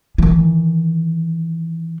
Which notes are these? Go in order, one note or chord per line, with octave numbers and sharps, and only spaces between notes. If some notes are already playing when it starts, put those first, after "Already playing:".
D#3 E3